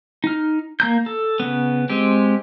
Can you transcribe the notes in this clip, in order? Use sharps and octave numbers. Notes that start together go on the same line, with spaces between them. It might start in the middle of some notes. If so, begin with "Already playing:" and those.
D#4 F6
A#3 A#5 G6
A4
C#3 B3
G#3 C4 G4